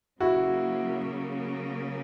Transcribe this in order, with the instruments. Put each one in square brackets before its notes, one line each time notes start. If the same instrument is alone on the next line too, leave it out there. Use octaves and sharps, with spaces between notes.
[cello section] C#3 F#3 A#3 [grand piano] E4 F#4